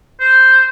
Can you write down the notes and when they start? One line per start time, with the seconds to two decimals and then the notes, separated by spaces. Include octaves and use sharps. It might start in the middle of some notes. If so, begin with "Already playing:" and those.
0.20 C5